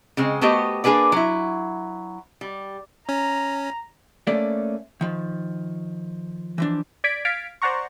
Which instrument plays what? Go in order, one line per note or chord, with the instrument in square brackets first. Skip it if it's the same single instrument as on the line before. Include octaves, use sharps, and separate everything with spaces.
[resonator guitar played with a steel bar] C#3 G#3 C4
A3 B3 F#4 G4 C5 D#5
A#3 D4 G#4 B4 D5
F#3 E4
G3
[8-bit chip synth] C#4 [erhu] A#5
[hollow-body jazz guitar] A3 A#3 C#4 A4 D5
D#3 F3
E3 F3 D4
[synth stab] D5 G#6 B6 D7
F5 F6 G#6 A6 B6 D7
C5 D5 F#5 A#5 C#6